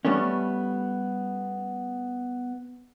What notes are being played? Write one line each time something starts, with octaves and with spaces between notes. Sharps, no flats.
G3 A3 B3 C#4